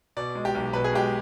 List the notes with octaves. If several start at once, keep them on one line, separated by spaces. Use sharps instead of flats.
B2 D5
G#3
G4
B1
B2 B4
G#4
G#3 G4